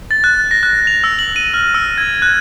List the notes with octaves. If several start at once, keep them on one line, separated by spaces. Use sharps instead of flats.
A6
F#6
A#6
F#6
F7
E6
F#7
D#7
F6
E6
G#6
F#6